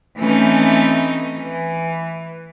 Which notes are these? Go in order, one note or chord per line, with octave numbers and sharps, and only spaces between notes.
E3 A3 C4 C#4 D#4
E3